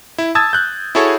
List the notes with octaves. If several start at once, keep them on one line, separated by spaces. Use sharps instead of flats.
E4
A5 D#6 E6 G#6 A6
F#6 G6
E4 F#4 G#4 A4 C#5